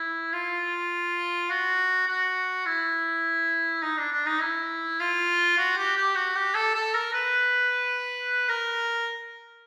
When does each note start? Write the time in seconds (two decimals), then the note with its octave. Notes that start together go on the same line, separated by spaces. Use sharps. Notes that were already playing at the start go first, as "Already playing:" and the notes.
Already playing: E4
0.33 F4
1.50 F#4
2.07 F#4
2.66 E4
3.82 D#4
3.98 D4
4.12 D4
4.26 D#4
4.41 E4
5.00 F4
5.58 F#4
5.77 G4
5.97 G4
6.16 F#4
6.36 G4
6.55 A4
6.74 A4
6.94 A#4
7.13 B4
8.49 A#4